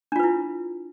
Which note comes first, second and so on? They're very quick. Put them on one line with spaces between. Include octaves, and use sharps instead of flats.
D4 F4 B4 E4